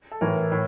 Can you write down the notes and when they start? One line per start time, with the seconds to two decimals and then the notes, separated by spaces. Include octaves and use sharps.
0.11 A4
0.21 A2 E3 A#4
0.52 A2